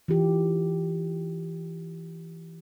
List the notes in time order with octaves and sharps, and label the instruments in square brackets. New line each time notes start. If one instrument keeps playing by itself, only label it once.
[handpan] E3 F4 G4